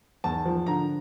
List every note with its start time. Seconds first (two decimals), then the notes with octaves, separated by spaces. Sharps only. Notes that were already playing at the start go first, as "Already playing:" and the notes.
0.24 E2 A5
0.45 F3
0.67 D3 A#5